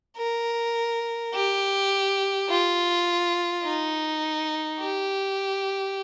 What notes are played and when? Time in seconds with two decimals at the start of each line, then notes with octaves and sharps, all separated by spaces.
0.17 A#4
1.33 G4
2.49 F4
3.64 D#4
4.80 G4